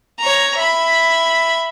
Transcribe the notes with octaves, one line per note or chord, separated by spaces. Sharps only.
C#5 A#5
E5 B5